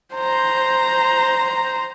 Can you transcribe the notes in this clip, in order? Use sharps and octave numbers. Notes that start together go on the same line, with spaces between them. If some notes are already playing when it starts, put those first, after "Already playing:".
C5 A#5